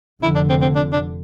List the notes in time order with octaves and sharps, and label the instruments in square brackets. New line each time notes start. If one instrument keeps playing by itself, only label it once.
[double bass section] F1 F2 D3 [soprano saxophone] E4
[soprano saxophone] D4
C4
C4
D4
D4